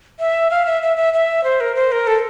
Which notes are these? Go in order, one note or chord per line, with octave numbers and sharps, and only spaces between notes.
E5
F5
E5
E5
E5
E5
C5
A#4
C5
A#4
A4